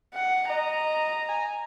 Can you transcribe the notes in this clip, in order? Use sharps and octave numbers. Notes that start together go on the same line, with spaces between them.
F#5
D#5 A#5
G#5